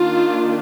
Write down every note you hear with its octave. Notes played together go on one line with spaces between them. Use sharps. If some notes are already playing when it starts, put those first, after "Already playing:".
Already playing: D#3 A#3 D4 F4